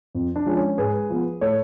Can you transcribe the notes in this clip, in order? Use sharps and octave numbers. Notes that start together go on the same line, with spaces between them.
F2
D4
F3 G#3 C#4
C#4
G#2 G#4 B4
F3 B3
A2 A4 C#5